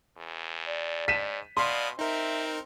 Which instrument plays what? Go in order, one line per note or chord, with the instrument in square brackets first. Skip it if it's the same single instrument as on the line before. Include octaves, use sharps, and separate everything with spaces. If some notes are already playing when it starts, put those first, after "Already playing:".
[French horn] E2
[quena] D5
[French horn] G#2 [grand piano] B6 D#7 E7
[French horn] B2 [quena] D5 [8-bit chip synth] F5 B5 D#6 [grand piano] C6
[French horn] C4 [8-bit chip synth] D#4 A#4 [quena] E5